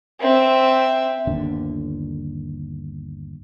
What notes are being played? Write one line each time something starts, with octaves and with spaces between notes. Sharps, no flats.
C4 E5
G1 D#2 D3